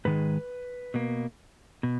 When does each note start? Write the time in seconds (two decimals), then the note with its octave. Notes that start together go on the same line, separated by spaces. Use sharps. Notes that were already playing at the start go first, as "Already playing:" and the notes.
0.05 G#2 D#3 G#3 B4
0.94 B2 A#3
1.83 B2